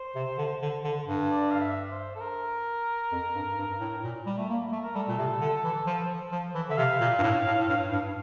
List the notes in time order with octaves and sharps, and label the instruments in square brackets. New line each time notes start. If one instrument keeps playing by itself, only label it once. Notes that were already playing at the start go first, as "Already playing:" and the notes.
Already playing: [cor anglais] C5
[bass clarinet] C3
D3
D3
D3
G2
[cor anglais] D5
F5
E5
C5
A4
A#4
[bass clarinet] F2
G2
G2
A2
A#2
G3
A3
A#3
A3
[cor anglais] A#4
[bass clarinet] G3 [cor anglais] A4
[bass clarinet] A#2
C3
D3
E3
F3
F3
E3
[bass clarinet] D3 [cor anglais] E5
[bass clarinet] C3 [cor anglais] F5
[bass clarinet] A#2
G2
A2
A2
A2
G2
G2